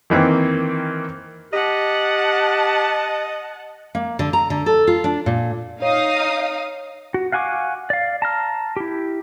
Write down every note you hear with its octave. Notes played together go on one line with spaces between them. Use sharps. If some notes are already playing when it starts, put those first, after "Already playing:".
D#3 E3 A#3 C4
G4 D#5 F#5 A5
A#3
D3
A#5
D3
A4
F4
D4
A#2
D#4 C#5 F5 D#6
F#4
F5 F#5 G#5 C#6 D6
D5 F5
A5 A#5 F6
E4 G4